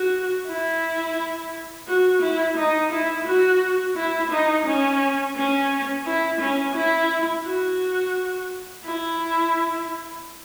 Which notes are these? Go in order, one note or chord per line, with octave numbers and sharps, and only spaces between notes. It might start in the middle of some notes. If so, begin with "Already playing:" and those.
Already playing: F#4
E4
F#4
E4
D#4
E4
F#4
E4
D#4
C#4
C#4
E4
C#4
E4
F#4
E4